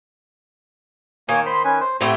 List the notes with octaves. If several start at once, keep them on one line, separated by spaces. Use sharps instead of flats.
D#3 A#3 C#5 G#5
C5 B5 C6
C#4 B4 G#5
C5
A2 A3 C4 G4